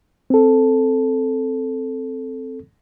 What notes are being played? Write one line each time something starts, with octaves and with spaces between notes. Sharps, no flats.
C4 A4